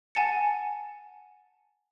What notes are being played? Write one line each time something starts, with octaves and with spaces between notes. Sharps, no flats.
F#5 G#5 A5 A6 C#7